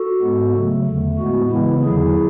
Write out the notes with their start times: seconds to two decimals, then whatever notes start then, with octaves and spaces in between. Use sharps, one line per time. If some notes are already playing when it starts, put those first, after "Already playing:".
Already playing: F#4 A4
0.21 G#2 G#3 B3
0.54 C#3 F#3 A3
0.86 E2 D3 A3
1.18 A2 G#3 B3 F#4
1.51 C#3 E3 G#3 B3 E4
1.83 E2 D3 F#3 E4 G#4